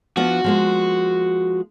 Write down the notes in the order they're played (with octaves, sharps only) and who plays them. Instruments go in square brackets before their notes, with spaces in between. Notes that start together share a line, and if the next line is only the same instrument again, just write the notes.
[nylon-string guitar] F3 B3 D4 [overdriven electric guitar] F#4
[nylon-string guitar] F3 G#3 A#3